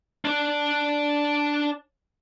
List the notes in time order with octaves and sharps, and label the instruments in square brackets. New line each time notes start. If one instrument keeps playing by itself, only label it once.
[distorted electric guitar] D4 D5